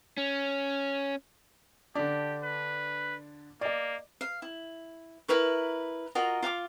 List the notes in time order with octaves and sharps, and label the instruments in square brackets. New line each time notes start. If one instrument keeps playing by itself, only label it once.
[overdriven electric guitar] C#4
[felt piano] D3 D4 [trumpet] G4
[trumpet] B4
[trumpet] A#3 [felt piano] D5 D#5
[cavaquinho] F5
E4
E4 A#4 B4 C#6
F4 F#4 A#4 D#5
F4 F5 A5 D6